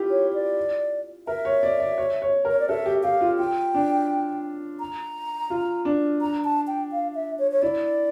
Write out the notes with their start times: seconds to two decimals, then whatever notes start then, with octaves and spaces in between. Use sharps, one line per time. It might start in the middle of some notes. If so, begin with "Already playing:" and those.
Already playing: E4 F4 G4
0.10 C#5
0.34 D5
1.27 A#4 E5
1.45 C#5
1.63 D5
1.80 D5
1.98 C#5
2.22 C#5
2.45 A#4
2.51 C#5
2.59 D5
2.69 A4 E5
2.86 G4
3.03 G4 F5
3.21 F4
3.38 F4 G5
3.74 D4
4.80 A#5
5.50 F4
5.85 D4
6.21 A#5
6.44 A5
6.67 G5
6.92 F5
7.15 E5
7.39 C#5
7.51 C#5
7.62 E4 D5